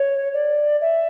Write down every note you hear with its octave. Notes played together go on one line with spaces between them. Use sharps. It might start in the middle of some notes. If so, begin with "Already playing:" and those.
Already playing: C#5
D5
E5